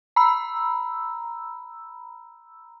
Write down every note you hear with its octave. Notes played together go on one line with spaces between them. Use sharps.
A#5 B5 E6